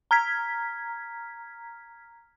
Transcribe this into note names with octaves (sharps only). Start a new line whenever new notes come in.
A#5 F6 G#6 B6